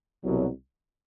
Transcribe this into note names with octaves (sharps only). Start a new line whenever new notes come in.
C2 B2 F#3